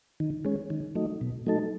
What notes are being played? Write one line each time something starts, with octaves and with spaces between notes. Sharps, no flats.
D#3
G#3 C#4
D#3
F#3 A3 D#4
B2
F#3 A3 D#4 A4